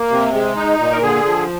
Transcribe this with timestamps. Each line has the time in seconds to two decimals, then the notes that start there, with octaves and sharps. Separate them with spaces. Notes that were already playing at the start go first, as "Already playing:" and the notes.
Already playing: A#3
0.10 C3
0.33 G#3
0.56 D#4
0.79 A#2
0.91 A#4
1.02 D3 G#4
1.25 F3